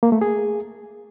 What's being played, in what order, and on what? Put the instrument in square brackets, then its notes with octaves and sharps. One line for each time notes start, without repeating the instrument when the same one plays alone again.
[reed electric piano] A#3
A3
G#4